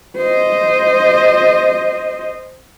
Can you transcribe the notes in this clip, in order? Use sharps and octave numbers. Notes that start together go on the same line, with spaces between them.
C5 D#5